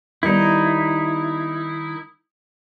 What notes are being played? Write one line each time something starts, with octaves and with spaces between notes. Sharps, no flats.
D#3 G3 B3 D#4 E4